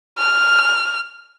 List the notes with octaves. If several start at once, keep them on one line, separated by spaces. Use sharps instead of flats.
F6